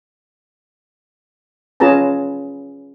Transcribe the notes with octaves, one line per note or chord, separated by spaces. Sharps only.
C#4 F4 G#4 B4 A5 A#5